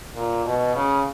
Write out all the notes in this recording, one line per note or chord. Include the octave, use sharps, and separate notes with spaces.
A#2
B2
C#3